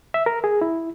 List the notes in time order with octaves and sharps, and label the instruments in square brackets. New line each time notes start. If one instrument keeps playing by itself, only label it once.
[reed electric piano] E5
A#4
G#4
E4